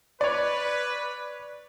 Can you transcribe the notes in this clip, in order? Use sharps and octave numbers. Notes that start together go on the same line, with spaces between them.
B4 C#5 D5